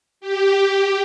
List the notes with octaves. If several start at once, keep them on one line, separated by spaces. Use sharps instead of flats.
G4